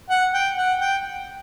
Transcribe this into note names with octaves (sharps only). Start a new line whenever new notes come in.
F#5
G5
F#5
G5